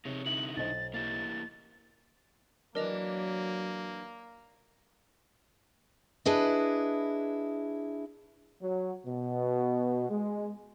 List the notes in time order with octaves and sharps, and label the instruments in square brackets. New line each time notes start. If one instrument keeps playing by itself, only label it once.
[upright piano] C3 [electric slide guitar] D#4 G#4 C#5
[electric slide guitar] D3 D#4 E4 [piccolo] F#7
[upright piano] B1 C5 D#5 [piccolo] A6
[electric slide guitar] A#3 E4 G4 [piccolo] A6
[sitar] E3 D4 [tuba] F#3 [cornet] A#3 [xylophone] A#4 D#5 F7
[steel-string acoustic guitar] D4 E4 G#4 B4 D#5
[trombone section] F#3
B2
G#3